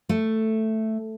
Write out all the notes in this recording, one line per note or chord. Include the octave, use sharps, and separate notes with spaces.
A3